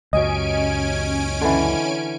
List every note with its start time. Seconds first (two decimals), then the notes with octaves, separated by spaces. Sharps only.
0.13 C#2 F#2 F#3 C#4 D#5 G#5 D7
1.41 D3 E3